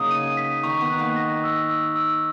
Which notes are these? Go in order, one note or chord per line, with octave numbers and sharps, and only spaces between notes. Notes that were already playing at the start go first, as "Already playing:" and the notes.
Already playing: C#3 F#3 A#3 C#4 D#4 A#4 D#6
D#7
B6
D#3 D#4 C#6
B3 B4
F#6
A#3 A#4
A#6
E6
E6
E6